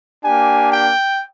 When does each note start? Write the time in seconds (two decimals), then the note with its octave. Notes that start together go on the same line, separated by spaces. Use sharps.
0.24 A#3 D4 G4 G#5
0.73 G5